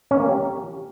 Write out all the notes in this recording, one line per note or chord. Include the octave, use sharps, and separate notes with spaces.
C#4
A#3
G4